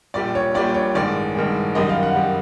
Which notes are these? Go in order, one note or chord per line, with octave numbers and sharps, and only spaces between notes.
A#1 A#2 G3 D5
C#5
A#1 A#2 G3 D5
C#5
A1 G2 D#3 G#3 D5
A1 G2 D#3 G#3
F#2 D#3 G3 D#5
F5
F#5
D#3 G3